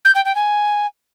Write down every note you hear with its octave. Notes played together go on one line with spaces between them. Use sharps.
G6
G5
G5
G#5